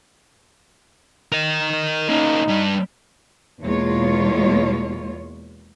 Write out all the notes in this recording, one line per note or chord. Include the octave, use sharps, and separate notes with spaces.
A#4 D#5
A#3 C#4 D#4
G2 G3
E2 B2 G#3 A#3 F4 C#5